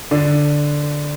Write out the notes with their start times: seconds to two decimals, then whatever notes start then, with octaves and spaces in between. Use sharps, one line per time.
0.11 D3 D4